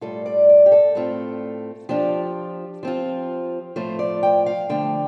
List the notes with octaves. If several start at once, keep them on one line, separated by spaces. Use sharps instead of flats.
A2 G3 F4 A4
D5
D5
G4
A4
A2 A3 C4 F4
F3 D4 F4 G4
F3 C4 F4
A2 F3 A3 F4 C5
D5
G5
F5
D3 F3 A3 G5